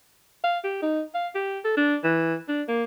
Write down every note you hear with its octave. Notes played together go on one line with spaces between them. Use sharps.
F5
G4
D#4
F5
G4
A4
D4
E3
D4
A#3